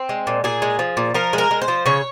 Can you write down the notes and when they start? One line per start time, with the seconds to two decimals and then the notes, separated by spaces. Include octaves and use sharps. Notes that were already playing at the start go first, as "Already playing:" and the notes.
Already playing: C4
0.09 G#3
0.27 A#2
0.44 A#2 G#4
0.62 G#3
0.79 F3
0.97 A#2
1.14 F3 A#4
1.33 G#3 A#4
1.51 G#3
1.62 C5
1.68 F3
1.86 C#3 C#5